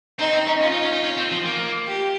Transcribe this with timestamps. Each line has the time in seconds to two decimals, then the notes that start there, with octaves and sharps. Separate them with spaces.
0.19 C4 D#4
0.33 C4
0.47 C#4
0.61 C#4 F4
0.71 D#4
0.82 C#4
0.92 D#4
1.03 C#4
1.17 C4
1.32 F3
1.45 A#3
1.87 G4